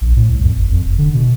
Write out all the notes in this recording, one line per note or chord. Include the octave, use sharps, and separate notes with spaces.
A#1
A2
C2
F2
G#1
F2
E1
D3
B2